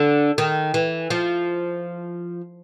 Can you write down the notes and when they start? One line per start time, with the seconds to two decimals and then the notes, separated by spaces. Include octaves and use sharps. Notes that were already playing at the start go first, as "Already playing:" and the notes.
Already playing: D3
0.38 D#3
0.74 E3
1.10 F3